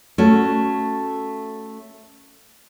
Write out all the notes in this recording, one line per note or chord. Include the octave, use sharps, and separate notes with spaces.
A3 C#4 F#4 A4